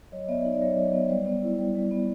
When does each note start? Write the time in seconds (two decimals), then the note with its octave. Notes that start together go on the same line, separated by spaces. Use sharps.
0.12 F#3 C#5 D#5
0.28 B3 D5 E5
0.45 D#4
0.52 D5
0.61 F#3 C#5 D#5
0.77 F#3
0.93 B3
1.09 G3 C5 D5
1.26 B3
1.43 E4
1.59 G3
1.75 G3
1.91 B3